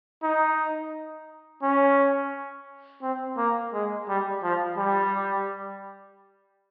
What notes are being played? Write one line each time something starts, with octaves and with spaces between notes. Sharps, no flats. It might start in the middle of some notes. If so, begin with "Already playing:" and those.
D#4
C#4
C4
A#3
G#3
G3
F3
G3